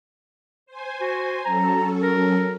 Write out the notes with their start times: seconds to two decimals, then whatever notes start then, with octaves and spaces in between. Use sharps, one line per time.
0.66 C5 G#5
1.01 F#4
1.45 F#3 C#4 A4 A#5
2.03 A#4